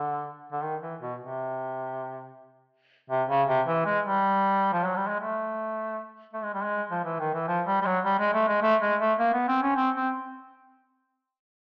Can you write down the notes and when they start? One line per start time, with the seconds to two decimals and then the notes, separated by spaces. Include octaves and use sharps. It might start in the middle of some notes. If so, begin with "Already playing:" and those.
Already playing: D3
0.52 D3
0.63 D#3
0.82 E3
1.01 B2
1.20 C3
3.10 C3
3.29 C#3
3.48 C3
3.67 E3
3.86 G#3
4.05 G3
4.73 F3
4.85 F#3
4.96 G3
5.08 G#3
5.20 A3
6.34 A3
6.44 G#3
6.54 G3
6.64 G#3
6.91 F3
7.05 E3
7.19 D#3
7.34 E3
7.48 F3
7.67 G3
7.82 G3
7.86 F#3
8.05 G3
8.19 G#3
8.34 A3
8.48 G#3
8.62 A3
8.81 G#3
9.00 A3
9.19 A#3
9.33 B3
9.48 C4
9.62 C#4
9.76 C4
9.95 C4